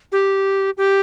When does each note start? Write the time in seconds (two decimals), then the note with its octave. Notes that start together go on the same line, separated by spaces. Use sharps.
0.12 G4
0.77 G4